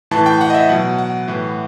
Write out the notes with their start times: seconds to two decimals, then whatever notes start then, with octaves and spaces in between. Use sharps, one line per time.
0.11 A2 E3 A5
0.26 G5
0.41 F#5
0.50 D#5
0.55 E5
0.69 B2 F#3 F#5
0.98 F#5
1.28 A2 E3